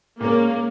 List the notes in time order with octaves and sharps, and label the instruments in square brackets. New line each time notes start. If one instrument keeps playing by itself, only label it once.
[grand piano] A#2 G#3 C#4 [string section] A#3